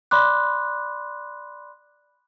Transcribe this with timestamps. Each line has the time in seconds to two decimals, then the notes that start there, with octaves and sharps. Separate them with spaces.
0.11 D5 B5 C6 D6 F#6